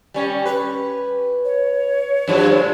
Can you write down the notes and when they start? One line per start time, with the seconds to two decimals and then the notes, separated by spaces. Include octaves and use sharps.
0.14 G3 C#4
0.46 B4
1.44 C#5
2.28 G2 F3 F#3
2.49 A2 G#3